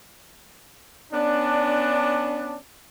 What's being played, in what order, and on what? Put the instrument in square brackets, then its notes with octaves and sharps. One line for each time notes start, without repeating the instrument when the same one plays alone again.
[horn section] B3 C#4 D4